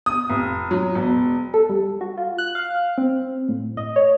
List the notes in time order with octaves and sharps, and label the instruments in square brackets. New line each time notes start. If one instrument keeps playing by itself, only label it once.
[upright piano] D#6
F1
F#3
E1
[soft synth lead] A4
G3
F#4
F4
F#6
F5
C4
A2
D#5
C#5